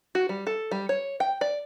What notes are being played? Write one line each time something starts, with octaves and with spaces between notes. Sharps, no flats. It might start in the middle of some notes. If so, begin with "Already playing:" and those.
F#4
G3
A4
G3
C#5
G5
D5